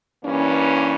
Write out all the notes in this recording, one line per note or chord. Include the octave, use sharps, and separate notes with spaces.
G2 E3 A#3 C#4